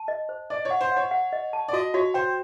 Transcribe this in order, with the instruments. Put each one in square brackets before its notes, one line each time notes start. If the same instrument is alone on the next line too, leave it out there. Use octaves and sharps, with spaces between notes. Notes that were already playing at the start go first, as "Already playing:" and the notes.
Already playing: [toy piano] A5
D#5
C5
[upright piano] D5 [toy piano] D#5
[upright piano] C#5
[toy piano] F#5
[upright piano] C5
[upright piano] C#5 [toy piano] F#5
[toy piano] F#5
D#5
A5
[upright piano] D5
[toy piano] F#4 [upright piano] D#5
[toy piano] F#4 [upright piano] C#5
[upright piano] C5 [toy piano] G5